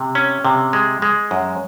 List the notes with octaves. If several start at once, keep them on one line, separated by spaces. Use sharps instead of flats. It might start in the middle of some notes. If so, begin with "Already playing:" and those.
Already playing: C3
C#4
C3
G#3
G#3
F#2